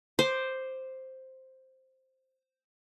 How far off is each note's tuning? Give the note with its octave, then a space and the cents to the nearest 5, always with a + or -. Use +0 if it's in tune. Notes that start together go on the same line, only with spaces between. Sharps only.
C5 +0 D6 +10